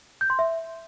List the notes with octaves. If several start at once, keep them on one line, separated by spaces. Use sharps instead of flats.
G6
C6
E5